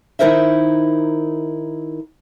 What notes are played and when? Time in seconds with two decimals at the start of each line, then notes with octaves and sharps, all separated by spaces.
0.19 D#3 D#4 E4 A#4 C5 E5